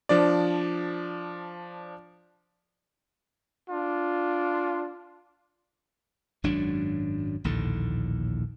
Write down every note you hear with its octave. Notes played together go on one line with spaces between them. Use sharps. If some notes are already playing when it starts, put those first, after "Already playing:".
F3 D4 D5
D4 F4
G#1 F#2 F#3 D4
A#1 D#2 A2 D3